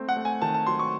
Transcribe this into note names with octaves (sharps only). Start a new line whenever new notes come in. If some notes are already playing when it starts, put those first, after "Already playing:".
Already playing: A3 C4
F#5
A3
G#5
D#3 A5
A5
F#3 C6
C#6